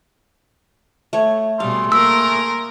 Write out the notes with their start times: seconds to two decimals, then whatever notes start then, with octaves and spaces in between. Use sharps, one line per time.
1.13 A3 C#5
1.60 B2 G3 A3 G#4 F5 C6
1.92 A#3 A#4 B5 E6